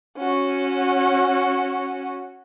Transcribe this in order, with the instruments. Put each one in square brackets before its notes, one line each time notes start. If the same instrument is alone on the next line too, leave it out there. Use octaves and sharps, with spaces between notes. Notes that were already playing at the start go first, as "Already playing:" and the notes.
[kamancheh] C#4 F#4